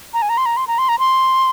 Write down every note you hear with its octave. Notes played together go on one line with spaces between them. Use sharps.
A#5
G#5
A#5
C6
A#5
C6
A#5
C6
A#5
C6